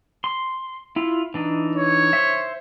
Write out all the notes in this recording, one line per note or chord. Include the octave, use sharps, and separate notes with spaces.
C6
E4 F4
E3 D4 D#4
C#5
C5 E5